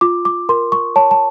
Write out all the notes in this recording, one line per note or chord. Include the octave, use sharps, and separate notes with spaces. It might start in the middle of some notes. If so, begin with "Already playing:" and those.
F4 D6
D6
A#4 C6
C#6
C#5 A5
A5